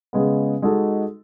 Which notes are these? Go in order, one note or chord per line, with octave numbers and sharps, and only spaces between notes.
C#3 G#3 B3
G#3 D#4 F#4 A4